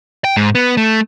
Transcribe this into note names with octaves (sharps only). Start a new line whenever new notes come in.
G5
G#2
B3
A3